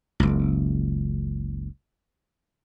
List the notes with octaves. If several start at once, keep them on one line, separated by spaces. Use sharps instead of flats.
F#1 C#2